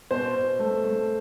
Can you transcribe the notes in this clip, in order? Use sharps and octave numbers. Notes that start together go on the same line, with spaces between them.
B2 C5
B2
A3
A3